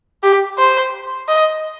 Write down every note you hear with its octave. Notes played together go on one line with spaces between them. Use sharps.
G4
C5
D#5